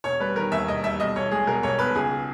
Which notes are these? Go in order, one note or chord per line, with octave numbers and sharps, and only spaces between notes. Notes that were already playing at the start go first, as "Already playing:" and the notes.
E1 C#5
G3 B4
D#3 A#4
D#2 E5
E1 D#5
G3 E5
B1 D#5
B1 C#5
G#3 G#4
B2 A#4
B1 C#5
B1 B4
C#2 G#4